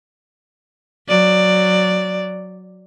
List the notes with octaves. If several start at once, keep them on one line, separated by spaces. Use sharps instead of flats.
F#3 D5